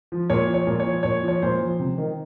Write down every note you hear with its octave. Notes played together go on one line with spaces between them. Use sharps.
F3
A#2 C#5
F3
C#5
A#2
C#5
F3
A#2 C#5
F3 C#5
A#2 C5
F3
C3
D#3